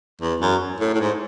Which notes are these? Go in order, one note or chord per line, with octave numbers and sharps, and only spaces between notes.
E2
F#2
A2
A2
G#2